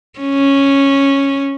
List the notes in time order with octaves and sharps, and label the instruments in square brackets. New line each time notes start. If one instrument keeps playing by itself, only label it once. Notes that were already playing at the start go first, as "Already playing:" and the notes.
[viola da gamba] C#4